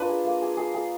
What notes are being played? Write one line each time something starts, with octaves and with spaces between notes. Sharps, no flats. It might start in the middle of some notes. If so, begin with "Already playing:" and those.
Already playing: D4 F4 A#4 B4
G#4
A#3
G#4
G#4
G#4